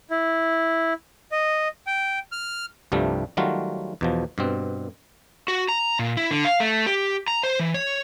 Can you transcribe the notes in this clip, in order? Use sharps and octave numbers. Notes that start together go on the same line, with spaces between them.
E4
D#5
G5
F6
C2 G2 C3 F3 G3 A3
D#3 F#3 G3 A3 F4 F#4
E2 B2 F3
G2 B2 C4
F#4
A#5
A#2
E4
D3
F5
A3
G4
A#5
C5
E3
C#5